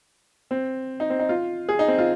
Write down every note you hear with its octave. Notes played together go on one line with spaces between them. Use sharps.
C4
D#4
C4
D#4
F4
G#4
D#4
C4
F4